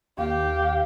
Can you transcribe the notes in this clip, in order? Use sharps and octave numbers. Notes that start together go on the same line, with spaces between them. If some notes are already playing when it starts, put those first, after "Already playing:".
D#2 G4 F5